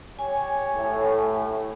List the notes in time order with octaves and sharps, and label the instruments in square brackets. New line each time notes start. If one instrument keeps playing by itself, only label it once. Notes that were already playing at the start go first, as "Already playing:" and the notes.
[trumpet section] G4 C#5 [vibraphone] G#5
[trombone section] A2